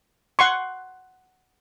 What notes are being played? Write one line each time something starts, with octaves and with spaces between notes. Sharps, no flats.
F#5 C6 C#6